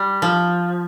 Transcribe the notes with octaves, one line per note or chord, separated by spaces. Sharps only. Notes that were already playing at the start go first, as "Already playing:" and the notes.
Already playing: G3
F3